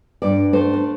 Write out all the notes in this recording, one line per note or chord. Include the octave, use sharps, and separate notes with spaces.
G2 D5
A3 C5
D4